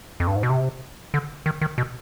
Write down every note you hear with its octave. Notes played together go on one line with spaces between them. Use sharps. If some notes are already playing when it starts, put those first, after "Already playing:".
F2
G2
G#2
B2
C3
D3
D#3
D#3
B2